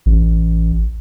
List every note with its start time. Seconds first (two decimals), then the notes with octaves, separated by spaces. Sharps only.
0.06 A1